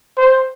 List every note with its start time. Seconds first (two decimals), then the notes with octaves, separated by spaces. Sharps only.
0.18 C5